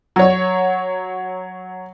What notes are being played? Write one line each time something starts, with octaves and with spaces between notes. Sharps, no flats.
F#3 C#5